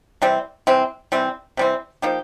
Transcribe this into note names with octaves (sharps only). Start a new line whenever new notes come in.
C3 E3 G3 C4
C3 E3 G3 C4
C3 E3 G3 C4
C3 E3 G3 C4
F3 A#3 D#4 G4